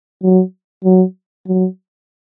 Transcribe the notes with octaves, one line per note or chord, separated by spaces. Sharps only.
F#3
F#3
F#3